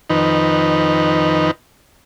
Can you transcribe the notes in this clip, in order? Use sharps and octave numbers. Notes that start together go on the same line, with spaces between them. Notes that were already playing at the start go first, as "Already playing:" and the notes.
F2 D#3 D#4 B4